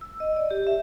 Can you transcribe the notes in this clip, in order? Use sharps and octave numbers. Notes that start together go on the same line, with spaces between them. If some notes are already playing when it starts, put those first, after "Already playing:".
E6
D#5
D5
G4
E5